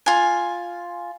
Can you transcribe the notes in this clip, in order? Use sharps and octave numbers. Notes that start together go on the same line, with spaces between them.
F4 G#5